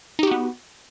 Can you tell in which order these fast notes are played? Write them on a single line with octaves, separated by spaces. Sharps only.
D#4 G4 F#4 B3